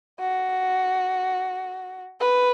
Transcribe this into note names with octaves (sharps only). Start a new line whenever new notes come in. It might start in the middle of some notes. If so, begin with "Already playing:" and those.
F#4
B4